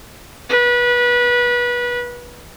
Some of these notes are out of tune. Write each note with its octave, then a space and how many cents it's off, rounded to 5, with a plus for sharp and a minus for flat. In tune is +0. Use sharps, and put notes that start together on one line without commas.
B4 -25